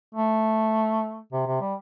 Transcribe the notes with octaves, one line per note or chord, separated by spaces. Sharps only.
A3
C3
C3
G3